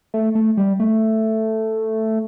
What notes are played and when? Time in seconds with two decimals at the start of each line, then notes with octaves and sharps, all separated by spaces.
0.14 A3
0.35 A3
0.57 G3
0.80 A3